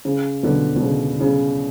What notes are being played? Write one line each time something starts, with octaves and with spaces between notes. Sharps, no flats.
C#3
B2 D3
B2
C#3
C#3